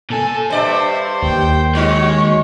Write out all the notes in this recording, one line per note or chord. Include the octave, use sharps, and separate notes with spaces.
A#2 A4 G#5
G2 C5 D5 E5
D#2 G5
G#3 D#4 F#4 C#5